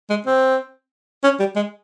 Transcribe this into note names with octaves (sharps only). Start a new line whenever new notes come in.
G#3
C4
C#4
G3
G#3